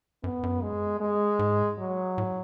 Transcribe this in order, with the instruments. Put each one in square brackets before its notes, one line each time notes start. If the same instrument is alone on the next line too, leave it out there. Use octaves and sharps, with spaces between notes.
[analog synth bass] F#2 [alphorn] B3
[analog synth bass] F#2
[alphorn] G#3
G#3
[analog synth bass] G#2
[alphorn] F#3
[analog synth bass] A2